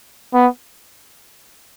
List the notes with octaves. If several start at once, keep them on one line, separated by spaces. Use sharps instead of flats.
B3